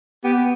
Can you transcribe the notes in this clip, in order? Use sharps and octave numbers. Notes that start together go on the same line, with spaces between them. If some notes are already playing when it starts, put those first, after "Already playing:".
B3 G4